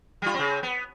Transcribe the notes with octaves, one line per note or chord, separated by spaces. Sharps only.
G3 F4
C#3 C4
B3